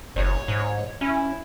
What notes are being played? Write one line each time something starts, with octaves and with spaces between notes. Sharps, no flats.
F#1 C#5
G#2
C#4 E4